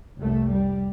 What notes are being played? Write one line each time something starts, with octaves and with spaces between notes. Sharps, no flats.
F1 C2 A3
G3